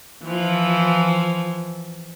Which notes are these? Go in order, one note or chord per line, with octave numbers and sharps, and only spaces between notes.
E3 F3